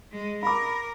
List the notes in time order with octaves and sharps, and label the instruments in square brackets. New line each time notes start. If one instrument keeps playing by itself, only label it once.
[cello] G#3
[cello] A#4 [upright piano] B5 D6